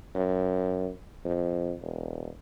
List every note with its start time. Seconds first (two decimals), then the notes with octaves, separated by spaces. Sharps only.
0.15 F#2
1.25 F2
1.81 E1